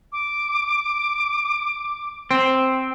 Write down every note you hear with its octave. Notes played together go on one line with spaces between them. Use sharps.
D6
C4